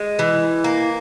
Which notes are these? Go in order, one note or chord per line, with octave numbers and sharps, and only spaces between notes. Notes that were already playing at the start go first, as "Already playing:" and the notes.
Already playing: G#3
E3
A#3